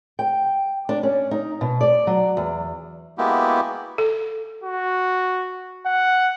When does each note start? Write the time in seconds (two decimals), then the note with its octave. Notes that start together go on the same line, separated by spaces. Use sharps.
0.19 G5
0.89 D4
1.03 C#4
1.31 D#4
1.61 B2
1.81 D5
2.07 F#3
2.37 E2
3.18 G#3 A#3 B3 E4 F#4 G4
3.98 A4
4.64 F#4
5.86 F#5